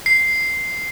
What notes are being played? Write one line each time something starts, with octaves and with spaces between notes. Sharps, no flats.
C7